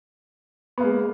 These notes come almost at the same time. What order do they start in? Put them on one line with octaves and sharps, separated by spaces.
B3 A#3 G#3